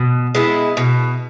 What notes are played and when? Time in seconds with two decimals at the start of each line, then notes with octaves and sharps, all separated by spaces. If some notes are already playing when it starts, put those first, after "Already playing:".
Already playing: B2
0.35 G#3 B3 E4
0.77 B2